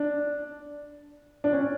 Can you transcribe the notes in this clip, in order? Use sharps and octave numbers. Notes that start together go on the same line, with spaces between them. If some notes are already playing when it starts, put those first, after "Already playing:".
Already playing: D4
D4
C#4